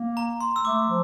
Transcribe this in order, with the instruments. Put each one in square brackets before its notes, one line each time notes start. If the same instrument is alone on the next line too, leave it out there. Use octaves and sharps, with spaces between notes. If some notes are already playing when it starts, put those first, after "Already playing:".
Already playing: [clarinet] A#3
[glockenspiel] A#5
C6
E6
[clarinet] A3 [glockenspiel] D6
[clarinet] F3